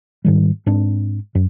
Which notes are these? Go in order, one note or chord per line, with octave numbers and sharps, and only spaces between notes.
G#2 D#3 G3
G#2 C4 D4
F#2